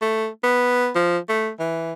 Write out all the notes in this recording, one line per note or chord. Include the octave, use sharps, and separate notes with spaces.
A3
B3
F3
A3
E3